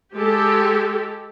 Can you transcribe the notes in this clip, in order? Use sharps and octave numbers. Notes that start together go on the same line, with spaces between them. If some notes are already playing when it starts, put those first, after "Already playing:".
G#3 G4 A4